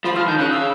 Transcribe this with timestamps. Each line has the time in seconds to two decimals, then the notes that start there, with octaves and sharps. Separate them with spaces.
0.04 F3 B5
0.16 F3 F6
0.28 D#3 G6
0.39 C#3 F#6
0.51 E6